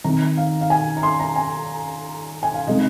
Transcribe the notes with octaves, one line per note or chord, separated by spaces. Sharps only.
D#3 C4 D#4 A#5
F5
F5
G#5
A#5
C6
A#5
G#5
G#5
F5
C3 G#3 D#4 D#5